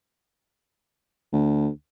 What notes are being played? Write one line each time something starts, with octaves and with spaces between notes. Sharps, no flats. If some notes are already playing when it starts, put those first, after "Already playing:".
D2